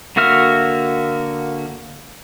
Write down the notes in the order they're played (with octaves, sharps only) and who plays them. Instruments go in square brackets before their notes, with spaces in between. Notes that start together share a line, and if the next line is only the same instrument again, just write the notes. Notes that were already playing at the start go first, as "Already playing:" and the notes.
[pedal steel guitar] D3 A#3 F#4 E5 F6